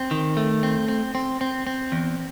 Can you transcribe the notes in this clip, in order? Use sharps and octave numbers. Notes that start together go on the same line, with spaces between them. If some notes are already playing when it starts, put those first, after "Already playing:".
Already playing: C4
D#3
A3
C4
C4
C4
C4
C4
E2